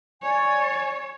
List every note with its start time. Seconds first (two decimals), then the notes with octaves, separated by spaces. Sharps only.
0.22 C#5 D5 G#5